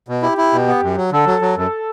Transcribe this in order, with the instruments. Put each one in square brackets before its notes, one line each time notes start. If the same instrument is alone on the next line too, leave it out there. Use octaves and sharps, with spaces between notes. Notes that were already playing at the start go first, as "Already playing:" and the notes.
[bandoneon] B2
[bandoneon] E4 [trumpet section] G4
[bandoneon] E4
B2
B3
F#2
F#3
[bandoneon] D3 [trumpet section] A4
[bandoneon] F#3
F#3
[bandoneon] F#2 [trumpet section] A4